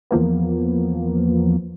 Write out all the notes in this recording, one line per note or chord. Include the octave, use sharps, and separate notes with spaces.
E2 F3 A#3 B3